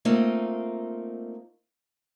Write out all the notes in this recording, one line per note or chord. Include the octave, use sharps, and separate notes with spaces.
A3 A#3 C4 D#4 F4 D#5